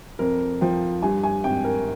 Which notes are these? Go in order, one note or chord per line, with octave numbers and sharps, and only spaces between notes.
F2 A#4
F3 G5
G2 G#5
G#5
G#1 G5
A#4